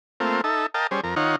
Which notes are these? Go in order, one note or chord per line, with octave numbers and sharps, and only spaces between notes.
A3 A#3 C4 F4
D#4 A4 E5
A#4 D#5 F5 G5 A5
G3 C#4 G#4 C5
F2 A#4
D#3 D#4 F4 C#5 F#5